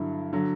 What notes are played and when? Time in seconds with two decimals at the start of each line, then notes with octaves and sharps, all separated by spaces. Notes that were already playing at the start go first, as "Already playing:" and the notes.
Already playing: G2 D3 F#3 E4
0.33 D3 F#3